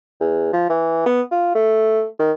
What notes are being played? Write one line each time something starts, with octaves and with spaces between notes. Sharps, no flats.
E2
F3
E3
B3
F4
A3
D#3